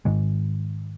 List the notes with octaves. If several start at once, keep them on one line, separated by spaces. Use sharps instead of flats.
G#2 D#3 G#3